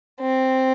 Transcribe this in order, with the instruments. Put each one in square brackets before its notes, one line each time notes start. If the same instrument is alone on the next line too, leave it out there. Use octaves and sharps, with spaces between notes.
[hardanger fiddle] C4